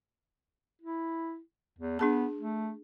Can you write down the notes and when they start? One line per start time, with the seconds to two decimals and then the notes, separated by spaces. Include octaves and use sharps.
0.81 E4
1.78 E2
1.99 B3 D4 G#4 A5
2.37 A3